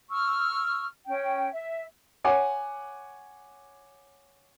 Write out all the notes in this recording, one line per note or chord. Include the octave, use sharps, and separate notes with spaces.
C#6 E6 F6
C#4 G5
E5
C#5 F#5 G#5 D6